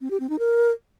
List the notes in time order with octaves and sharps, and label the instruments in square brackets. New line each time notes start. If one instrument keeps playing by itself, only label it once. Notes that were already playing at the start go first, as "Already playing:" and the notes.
[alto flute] C4
G4
C4
D#4
A#4